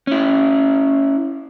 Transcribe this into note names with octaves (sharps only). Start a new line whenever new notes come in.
C#4 E4